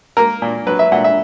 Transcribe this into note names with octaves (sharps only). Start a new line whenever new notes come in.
A#3 A#4
A#2
F#3 B4
E5
A#2 F#5
E5